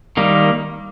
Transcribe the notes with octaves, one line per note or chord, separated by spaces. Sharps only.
D#3 G3 A#3